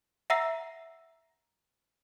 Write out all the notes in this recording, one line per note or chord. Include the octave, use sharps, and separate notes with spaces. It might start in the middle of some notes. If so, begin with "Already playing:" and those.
E5 F#5 A#5 E6 A#6 C7